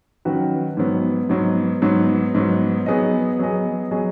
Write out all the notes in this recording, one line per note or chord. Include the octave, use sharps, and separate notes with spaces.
D#3 F#3 C#4 F#4 B4
G#2 F#3 B3
G#2 F#3 B3
G#2 F#3 B3
G#2 F#3 B3
F#3 B3 G#4 D#5
F#3 B3 G#4 D#5
F#3 B3 G#4 D#5